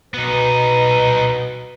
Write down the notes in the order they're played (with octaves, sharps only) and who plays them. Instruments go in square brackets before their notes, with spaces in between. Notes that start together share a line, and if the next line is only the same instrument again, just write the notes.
[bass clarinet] B2 [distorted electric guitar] B3 D#4 [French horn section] B4